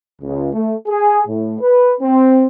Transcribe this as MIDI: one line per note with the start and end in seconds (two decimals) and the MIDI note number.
0.22 0.49 37
0.54 0.75 57
0.88 1.21 68
1.28 1.56 45
1.60 1.93 71
2.01 2.47 60